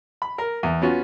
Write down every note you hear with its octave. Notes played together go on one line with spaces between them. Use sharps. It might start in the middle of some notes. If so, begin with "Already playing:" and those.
B5
A#4
E2
B3 C#4 F4 F#4